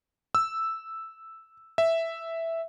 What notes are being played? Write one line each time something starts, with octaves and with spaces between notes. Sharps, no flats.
E6
E5